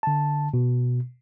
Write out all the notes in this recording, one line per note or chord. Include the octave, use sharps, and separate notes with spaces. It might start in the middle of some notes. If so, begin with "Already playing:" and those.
D3 A5
B2